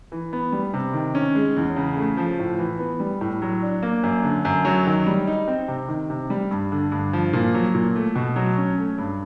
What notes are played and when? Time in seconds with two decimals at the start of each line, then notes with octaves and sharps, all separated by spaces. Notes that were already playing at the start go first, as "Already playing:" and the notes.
0.12 E3
0.33 B3
0.52 G3
0.74 C3
0.94 D#3
1.15 C#4
1.35 G#3
1.57 E2
1.76 C#3
1.97 A3
2.17 F3
2.39 A2
2.59 E3
2.79 B3
3.00 G3
3.21 A2
3.42 F#3
3.62 D4
3.83 A#3
4.03 F#2
4.24 D3
4.45 F#2
4.65 F#3
4.87 D#3
5.07 G3
5.27 D#4
5.48 C4
5.68 C3
5.88 D#3
6.10 C3
6.30 G3
6.51 G2
6.72 D3
6.92 G2
7.13 F3
7.33 A#2
7.54 F#3
7.75 A#2
7.96 A3
8.15 B2
8.36 F#3
8.58 C#4
8.78 A3
8.98 G2